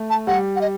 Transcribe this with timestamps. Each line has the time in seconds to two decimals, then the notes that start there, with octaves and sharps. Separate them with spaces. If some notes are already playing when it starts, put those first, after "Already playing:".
Already playing: A3
0.10 A5
0.27 G3 F#5
0.56 F#5
0.61 D#5